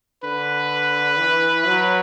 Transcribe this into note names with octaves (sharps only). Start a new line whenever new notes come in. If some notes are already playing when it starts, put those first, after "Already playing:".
D3 B4
E3
F#3